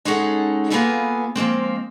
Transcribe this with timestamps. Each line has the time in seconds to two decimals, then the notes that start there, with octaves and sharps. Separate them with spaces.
0.05 G#3 C#4 D#4 G#4 A4 F#5
0.70 A#3 B3 F4 G#4 A4 B4
1.36 F3 G#3 A#3 C4